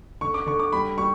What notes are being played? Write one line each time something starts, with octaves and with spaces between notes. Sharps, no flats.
D3 C#6
D6
D3 C#6
D6
G3 B5
G3 C#6